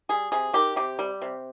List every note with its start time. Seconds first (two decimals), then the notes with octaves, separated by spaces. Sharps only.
0.09 G3 G#4
0.32 C3 G#4
0.53 D#3 G4
0.76 C3 G4
0.99 G3
1.22 C3